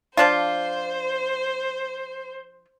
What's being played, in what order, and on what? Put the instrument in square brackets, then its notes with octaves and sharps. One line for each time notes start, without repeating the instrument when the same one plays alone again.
[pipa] F3 D4 F4 [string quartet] C5